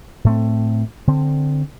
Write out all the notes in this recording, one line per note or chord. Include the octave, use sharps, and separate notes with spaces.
A2 A3 C4
D3 C4